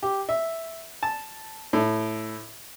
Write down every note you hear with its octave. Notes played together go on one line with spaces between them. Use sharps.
G4
E5
A5
A2